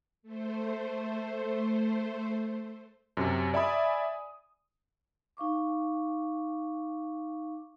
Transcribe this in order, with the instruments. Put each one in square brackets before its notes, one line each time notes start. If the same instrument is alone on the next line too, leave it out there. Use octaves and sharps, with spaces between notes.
[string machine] A3 C5
[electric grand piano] F#2 C3
D5 E5 G#5 B5 D#6
[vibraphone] D#4 F5 C#6 D6